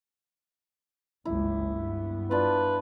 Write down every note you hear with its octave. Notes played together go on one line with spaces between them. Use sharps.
F#1 C#2 G2 E4
G2 B3
D4 F4 B4